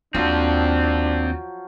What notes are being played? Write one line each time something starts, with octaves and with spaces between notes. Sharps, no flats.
D#2 F3 F#3 C4 D4 F4